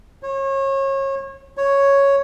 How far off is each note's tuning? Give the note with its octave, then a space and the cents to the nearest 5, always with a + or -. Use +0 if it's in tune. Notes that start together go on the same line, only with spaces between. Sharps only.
C#5 -30
C#5 +0